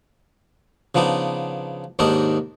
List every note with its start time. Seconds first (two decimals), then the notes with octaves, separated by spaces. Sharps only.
0.95 C#3 F3 B3 D4 D#4
1.99 D#2 G#2 D#3 D4 A#4 D#5